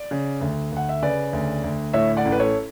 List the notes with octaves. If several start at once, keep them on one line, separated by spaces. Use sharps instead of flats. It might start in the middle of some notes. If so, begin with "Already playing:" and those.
Already playing: D5
C#3
D2
D2 F#5
E5
C#3 B4 D5
D2
D2
A2 C#5 E5
D5 F#5
A1
B4
A4 C#5